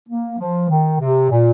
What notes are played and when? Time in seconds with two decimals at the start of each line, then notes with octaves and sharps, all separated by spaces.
0.09 A#3
0.39 F3
0.69 D#3
1.00 C3
1.30 A#2